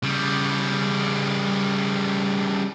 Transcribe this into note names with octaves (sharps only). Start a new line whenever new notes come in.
C#3 G3